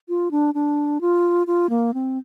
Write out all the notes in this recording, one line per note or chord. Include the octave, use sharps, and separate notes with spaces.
F4
D4
D4
F4
F4
A#3
C4